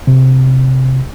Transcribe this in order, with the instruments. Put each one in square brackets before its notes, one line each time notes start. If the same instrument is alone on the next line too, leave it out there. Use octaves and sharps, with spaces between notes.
[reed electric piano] C3